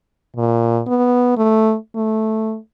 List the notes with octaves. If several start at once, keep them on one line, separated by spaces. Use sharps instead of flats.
A#2
B3
A3
A3